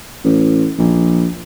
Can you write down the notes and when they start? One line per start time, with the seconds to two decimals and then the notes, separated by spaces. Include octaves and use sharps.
0.25 A1
0.79 A#1